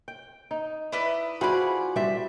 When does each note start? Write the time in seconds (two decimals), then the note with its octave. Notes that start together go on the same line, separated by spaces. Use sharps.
0.08 G5
0.51 D#4
0.92 E4 B4 D5 D#5
1.41 F3 E4 F#4 G#4 C5 D5 B5
1.96 G3 G4 C5 E5